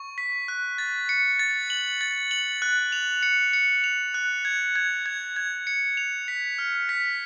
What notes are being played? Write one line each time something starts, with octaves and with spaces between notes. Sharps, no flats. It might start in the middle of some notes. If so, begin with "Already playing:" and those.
Already playing: C#6
B6
F#6
A6
C#7
A6
F#7
A6
F#7
F#6
F7
C#7
C#7
F7
F#6
G#6
G#6
G#6
G#6
C#7
F7
B6
F6
B6